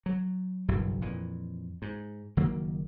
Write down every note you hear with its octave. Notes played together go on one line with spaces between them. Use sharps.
F#3
F#1 B1 G2 E3
F2 A#2 E3
G#2
F#1 D#3 F#3 A#3